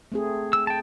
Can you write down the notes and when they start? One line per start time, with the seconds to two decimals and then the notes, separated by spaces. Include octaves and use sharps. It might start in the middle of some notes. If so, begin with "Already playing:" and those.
0.12 A3 C4 G#4
0.53 E6
0.67 G5 A5